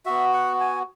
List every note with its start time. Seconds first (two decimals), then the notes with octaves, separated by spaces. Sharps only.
0.06 B3 F#4 E5
0.33 F#5
0.60 G#5